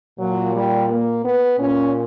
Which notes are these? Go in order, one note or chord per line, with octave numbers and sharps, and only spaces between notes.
A#2 F#3
G3
A#3
B3
A#2 C#4